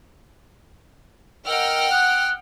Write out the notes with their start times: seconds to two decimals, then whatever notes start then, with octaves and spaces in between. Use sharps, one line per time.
1.46 A#4 D#5 F#5 G5 E6 F6
1.91 D#6 F#6